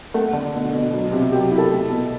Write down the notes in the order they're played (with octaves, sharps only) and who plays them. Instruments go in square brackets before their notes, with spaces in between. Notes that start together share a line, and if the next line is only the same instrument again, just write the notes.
[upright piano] A3 F#5
D3
B2
B2
F#3
C3
F#3 G4 G5
E4
A4 A5
A3
B2